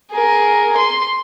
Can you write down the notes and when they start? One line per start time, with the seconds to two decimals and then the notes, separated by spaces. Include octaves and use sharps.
0.11 G#4 A#4
0.76 C6